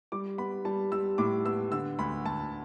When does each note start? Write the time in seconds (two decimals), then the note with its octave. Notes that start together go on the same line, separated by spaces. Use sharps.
0.12 G3 D6
0.38 B3 B5
0.65 G3 A5
0.92 G3 E6
1.18 A2 D6
1.46 B3 E6
1.72 D3 E6
1.99 D2 B5
2.25 D2 A5